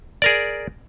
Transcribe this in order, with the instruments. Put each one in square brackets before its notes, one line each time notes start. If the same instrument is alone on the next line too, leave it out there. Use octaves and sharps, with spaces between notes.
[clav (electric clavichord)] G#4 A#4 D5